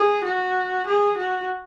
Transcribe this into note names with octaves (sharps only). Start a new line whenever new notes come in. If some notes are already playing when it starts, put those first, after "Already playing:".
Already playing: G#4
F#4
G#4
F#4